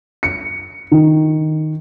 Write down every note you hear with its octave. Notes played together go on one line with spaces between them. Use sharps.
C#7
D#3